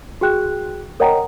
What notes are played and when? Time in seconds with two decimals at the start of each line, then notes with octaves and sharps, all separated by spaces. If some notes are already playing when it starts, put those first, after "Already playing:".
0.21 F#4 G#4 G5 F#6
1.00 A#4 C#5 D#5 F#5 G5 A#5